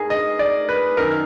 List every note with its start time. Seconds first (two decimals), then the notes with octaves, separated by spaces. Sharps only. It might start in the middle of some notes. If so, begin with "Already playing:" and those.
Already playing: G#2 G#4 A#4
0.10 D#5
0.39 D5
0.69 B4
0.97 F#2 D#3 A#4